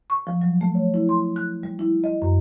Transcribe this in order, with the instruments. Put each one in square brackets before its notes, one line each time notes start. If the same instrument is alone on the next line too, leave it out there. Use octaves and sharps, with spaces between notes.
[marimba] C#6
F3
F#3
A3
C#5
E4
C6
F#6
G3
E4
D#5
F#2